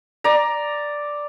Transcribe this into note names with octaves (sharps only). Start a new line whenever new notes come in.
D5 A#5